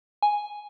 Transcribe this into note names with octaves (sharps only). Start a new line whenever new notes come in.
G#5